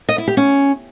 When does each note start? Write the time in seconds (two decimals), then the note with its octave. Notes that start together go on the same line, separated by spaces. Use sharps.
0.09 D#5
0.18 E4
0.28 G4
0.37 C#4